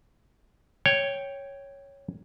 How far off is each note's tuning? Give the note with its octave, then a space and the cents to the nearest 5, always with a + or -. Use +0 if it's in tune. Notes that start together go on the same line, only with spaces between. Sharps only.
C#5 +0 G5 +0